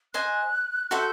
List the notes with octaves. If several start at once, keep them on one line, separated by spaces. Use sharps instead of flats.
C5 D#5 G#5 F#6
F#4 A4 C5 E5 G6